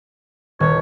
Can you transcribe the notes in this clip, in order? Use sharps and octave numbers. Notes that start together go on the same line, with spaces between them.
D#1 C#5